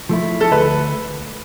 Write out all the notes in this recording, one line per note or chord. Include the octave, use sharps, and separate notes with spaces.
F3 A3 E4
A4
D2 B4